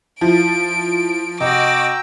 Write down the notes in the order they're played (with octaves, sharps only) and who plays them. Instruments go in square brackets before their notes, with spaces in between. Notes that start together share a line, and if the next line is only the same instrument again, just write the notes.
[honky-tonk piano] F3 [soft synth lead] E4 [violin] D7
[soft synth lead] C3 [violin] F#4 D6 [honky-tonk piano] D#5 [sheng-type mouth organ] G5 A#5 E6